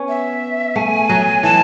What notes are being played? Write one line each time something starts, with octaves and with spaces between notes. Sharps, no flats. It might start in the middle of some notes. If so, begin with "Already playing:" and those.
Already playing: B3 C#4
E5
A3 G#5
F#3
E3 A5